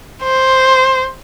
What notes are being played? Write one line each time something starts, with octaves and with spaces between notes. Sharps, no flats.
C5